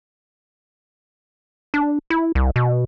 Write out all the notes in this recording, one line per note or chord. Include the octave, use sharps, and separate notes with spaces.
D4
E4
C2
B2